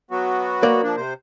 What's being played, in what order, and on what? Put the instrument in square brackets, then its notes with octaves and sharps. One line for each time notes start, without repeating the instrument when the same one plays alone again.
[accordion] F#3 B3 F#4
[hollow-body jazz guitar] A#3 D5
[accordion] F3 D4
C3 C5